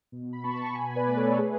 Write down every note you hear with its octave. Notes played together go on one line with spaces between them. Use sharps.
B2
B5
B3 A5 C#6
C#6
B2 G#5 B5
B4 D5
A3
A4 C#5
A3 G#4 B4